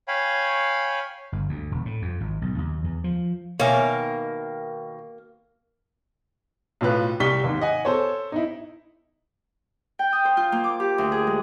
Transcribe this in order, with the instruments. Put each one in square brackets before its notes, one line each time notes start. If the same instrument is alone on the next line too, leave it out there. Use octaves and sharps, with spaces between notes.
[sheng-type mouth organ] C#5 F5 G5 G#5 B5
[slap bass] G1
D2
E1
A2
F2
G#1
B1
D#2
E2
F3
[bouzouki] B2 D#3 [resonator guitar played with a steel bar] A#3 [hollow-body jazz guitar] C#5 E5 G#5
[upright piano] B1 A2 F4 B4
C2 G3 C#6 B6 G7
D#2 G#2
D#5 F#5 G#5
A4 C5 C#5
D#4 E4
[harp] G5
D#6
C5
F4
A#3
D6
G4
D2
G#4
G#3